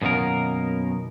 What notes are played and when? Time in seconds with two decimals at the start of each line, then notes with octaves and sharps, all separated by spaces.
0.02 F#2 B2 D#3 A#3 A#4